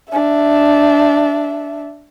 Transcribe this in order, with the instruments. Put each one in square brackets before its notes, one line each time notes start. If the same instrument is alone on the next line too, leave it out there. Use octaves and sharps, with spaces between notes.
[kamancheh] D4 E5